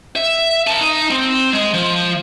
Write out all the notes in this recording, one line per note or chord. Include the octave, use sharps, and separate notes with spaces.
E5
A#4 A5
D#4
C4
G#3
F3